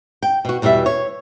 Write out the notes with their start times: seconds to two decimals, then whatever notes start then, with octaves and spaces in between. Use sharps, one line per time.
0.23 G5
0.45 B2 F#4
0.62 E2 B2 G3 A#4 E5
0.86 C#5